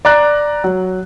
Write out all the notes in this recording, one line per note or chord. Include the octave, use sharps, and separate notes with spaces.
D5 A#5 F#6
F#3